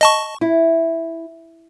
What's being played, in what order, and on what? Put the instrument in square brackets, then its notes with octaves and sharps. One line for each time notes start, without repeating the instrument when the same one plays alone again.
[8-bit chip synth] D#5 A5 C#6
[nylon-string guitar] E4